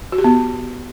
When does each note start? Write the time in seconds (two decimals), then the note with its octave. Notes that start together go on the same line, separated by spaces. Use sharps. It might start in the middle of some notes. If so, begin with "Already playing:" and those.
0.12 F#4
0.18 G4
0.24 B3